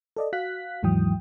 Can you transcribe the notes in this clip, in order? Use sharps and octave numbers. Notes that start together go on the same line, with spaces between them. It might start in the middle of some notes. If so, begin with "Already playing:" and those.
A4 D5 D#5
F#4 F5 F#6 B6
D#2 G#2 E3 F#3 G5 D#6